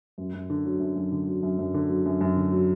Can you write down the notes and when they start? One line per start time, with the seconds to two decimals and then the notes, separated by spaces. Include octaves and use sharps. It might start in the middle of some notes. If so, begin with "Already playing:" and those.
0.18 F#2
0.34 F#2
0.50 D3
0.65 F#3
0.80 F#2
0.96 F#2
1.12 D3
1.27 F#3
1.43 F#2
1.59 F#2
1.74 D3
1.90 F#3
2.06 F#2
2.21 F#2
2.36 D3
2.52 F#3